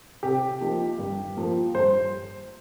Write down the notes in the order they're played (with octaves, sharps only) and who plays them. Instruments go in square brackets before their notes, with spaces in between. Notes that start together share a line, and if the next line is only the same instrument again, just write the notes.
[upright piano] C3 G4
F3 A#3 D#4
G2
F3 A#3
G2 C5